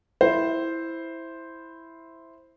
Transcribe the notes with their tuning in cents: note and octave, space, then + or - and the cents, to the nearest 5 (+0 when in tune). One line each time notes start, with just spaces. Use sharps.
E4 +0 C5 +0